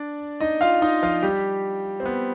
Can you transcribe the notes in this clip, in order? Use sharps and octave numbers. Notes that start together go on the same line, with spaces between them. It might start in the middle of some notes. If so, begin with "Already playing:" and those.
Already playing: D4 D5
D#4 D#5
F4 F5
D#4 D#5
F3 F4
G3 G4
C4
B3